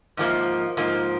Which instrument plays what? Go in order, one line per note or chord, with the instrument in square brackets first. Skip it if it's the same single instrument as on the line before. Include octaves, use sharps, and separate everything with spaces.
[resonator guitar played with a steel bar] G#2 F3 A#3
G#2 F3 A#3